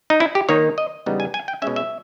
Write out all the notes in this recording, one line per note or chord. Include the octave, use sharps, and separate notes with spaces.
D#4
E4
G4
D#3 A#3 D#4 C#5
D#5
E2 C#3 G3 B3 D#4
G#5
G#5
G5
B2 G#3 C#4 E5
E5